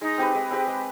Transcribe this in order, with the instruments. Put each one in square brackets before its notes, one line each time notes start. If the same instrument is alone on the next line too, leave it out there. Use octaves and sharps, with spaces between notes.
[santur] G#3 [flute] D#4
[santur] C4 G4 B4
G#3
C4 G4 B4
G#3